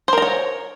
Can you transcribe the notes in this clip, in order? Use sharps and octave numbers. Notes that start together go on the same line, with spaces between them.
A#4 C5 C#5 A#5